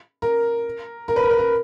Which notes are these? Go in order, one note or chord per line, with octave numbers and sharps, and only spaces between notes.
A#4
A#4
B4
A#4
B4
A#4